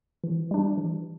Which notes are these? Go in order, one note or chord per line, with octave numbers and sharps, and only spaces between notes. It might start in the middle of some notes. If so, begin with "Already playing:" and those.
E3
G3 D4
E3